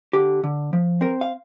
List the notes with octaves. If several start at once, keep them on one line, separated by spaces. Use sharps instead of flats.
D3 G4
D3
F3
C4 A#4
F5